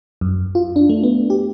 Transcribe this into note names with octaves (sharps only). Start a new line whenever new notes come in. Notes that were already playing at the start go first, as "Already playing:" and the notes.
F#2
F4
D4
A3
B3
G4